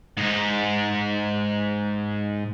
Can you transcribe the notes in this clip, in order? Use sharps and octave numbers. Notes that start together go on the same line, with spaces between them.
G#2 D#4